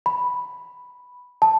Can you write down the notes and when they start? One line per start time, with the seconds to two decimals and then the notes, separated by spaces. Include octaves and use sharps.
0.06 B5
1.42 A5